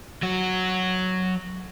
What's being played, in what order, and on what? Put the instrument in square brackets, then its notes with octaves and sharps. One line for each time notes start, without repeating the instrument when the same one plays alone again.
[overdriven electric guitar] F#3 F#4